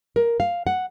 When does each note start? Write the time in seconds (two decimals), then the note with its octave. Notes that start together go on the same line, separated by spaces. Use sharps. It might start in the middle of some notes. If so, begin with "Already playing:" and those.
0.16 A#4
0.40 F5
0.67 F#5